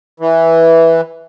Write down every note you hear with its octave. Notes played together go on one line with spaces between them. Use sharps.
E3